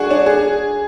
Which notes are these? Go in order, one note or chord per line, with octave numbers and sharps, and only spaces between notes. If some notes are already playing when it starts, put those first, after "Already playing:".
Already playing: D4 F#4 G#4
D4
G#4